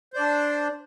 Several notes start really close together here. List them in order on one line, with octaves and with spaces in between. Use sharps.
C5 D5 D4